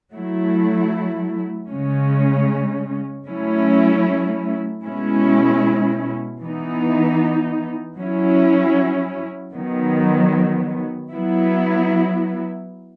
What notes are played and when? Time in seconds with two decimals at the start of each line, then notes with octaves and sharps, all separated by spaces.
0.12 F#3 A3 E4
1.69 C#3 G#3 C#4
3.25 F#3 A3 C#4 E4
4.83 B2 G#3 C#4 E4
6.40 E3 B3 D#4
7.96 F#3 C#4 E4
9.53 D#3 F#3 B3
11.10 F#3 B3 E4